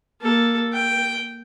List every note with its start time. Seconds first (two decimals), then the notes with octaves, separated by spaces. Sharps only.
0.21 A#3 A4
0.73 G5